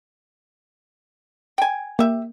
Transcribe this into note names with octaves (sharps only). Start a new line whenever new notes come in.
G5 G#5
A#3 G4 E5